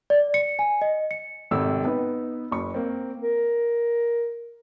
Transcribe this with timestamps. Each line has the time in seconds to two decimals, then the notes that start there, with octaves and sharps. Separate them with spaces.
0.10 D5
0.34 C#7
0.59 G#5
0.82 D#5
1.11 C#7
1.51 G#1 C3 A3 E6
1.85 B3 D#4 B4
2.51 F#1 C#6
2.74 A#3 C4
3.21 A#4